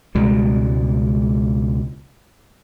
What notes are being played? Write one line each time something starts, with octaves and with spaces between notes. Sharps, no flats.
C#2 B2 G3 G#3